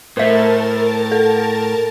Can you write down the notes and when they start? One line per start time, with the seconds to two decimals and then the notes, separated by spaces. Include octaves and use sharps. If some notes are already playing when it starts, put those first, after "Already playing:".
0.17 A2 A3 A#4 C5 E5 A5 A6
1.12 A4